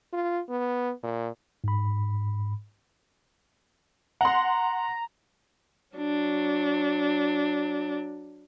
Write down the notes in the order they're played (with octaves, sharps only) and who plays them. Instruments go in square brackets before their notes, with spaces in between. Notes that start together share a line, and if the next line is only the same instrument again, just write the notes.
[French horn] F4
B3
A#2
[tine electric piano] G#2 B5
[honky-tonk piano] F#5 C6 [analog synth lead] A#5
[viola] F#3 D4